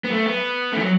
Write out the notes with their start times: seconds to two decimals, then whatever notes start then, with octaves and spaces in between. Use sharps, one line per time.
0.04 B3
0.11 A3
0.26 B3
0.72 E3 A3
0.81 F#3